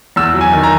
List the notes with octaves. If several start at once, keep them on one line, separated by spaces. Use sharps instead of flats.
E2 E6
F#3
G#5
D#3
A#5